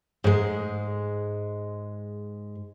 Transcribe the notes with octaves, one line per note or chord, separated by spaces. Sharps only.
G#2 G#3